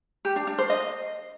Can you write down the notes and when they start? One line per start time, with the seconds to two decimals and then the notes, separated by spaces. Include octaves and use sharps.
0.25 G4
0.36 D4
0.47 D4
0.58 C5
0.70 D#5